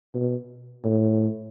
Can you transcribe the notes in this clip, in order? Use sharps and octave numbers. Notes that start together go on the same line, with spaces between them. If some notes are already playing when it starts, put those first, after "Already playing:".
B2
A2